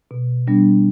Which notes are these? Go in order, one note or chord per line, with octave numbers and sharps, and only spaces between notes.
B2
G3 B3 D4